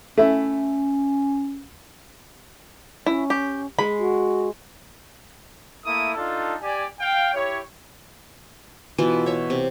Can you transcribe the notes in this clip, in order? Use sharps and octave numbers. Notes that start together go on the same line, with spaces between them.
A3 C#4 E4
C#4 E4
G4
G#3 B5
F#4
A3 A#3 E4 D#6
D4 D#4 F4 A4
G4 D5 G#5
F5 G5
E4 G4 C#5
B2 E3 F4
C#5 E5
C3